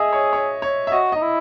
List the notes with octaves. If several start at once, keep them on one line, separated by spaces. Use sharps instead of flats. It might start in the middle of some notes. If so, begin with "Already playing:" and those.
Already playing: G#4 D#5 E5
C#5
C#5
C#5
E5
F#4 D#5
D#5
D#4
E4